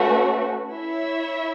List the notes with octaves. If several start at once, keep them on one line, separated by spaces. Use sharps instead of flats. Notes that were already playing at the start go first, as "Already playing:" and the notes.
Already playing: A3 C#4 F#4 B4
E4 C#5 E5